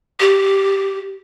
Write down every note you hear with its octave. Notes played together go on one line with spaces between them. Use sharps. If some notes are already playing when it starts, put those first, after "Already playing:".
G4